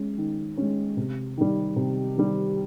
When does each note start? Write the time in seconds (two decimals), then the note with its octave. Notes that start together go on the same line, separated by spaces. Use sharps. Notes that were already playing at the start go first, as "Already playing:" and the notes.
Already playing: G#3 C#4
0.18 D#3
0.57 G#3 C#4
0.97 C3
1.37 D#3 G3
1.76 C3
2.16 D#3 G3